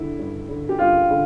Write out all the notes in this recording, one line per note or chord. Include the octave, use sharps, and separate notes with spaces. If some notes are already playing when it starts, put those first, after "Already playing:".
Already playing: D3 E4
G2
D3
G4
G2 F4
D3